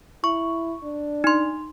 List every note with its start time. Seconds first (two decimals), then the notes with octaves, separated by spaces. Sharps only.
0.24 E4 C#6
0.83 D4
1.24 D#4 C6